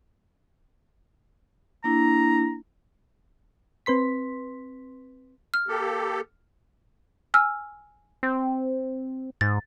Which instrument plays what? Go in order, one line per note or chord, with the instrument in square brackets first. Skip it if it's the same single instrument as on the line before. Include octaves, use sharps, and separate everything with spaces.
[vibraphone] A#3 D4 E4 [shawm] A#5
[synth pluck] C4 B4 C6 B6
[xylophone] F6
[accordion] A#3 G4 A4
[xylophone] G#5 E6 F6
[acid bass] C4
[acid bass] G#2 [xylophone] A6